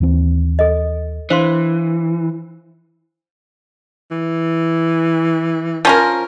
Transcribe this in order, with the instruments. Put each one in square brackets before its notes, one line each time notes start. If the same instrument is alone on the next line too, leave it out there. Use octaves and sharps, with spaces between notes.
[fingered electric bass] D#2 E3 C4
[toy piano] A4 D#5
[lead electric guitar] E3 [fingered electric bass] D4 [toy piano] C5 F5 C6
[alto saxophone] E3
[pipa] F3 C#4 A#4